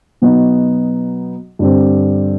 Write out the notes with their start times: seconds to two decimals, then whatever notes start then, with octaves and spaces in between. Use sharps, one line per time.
0.22 B2 F#3 B3 D#4
1.59 G2 D3 G3 C4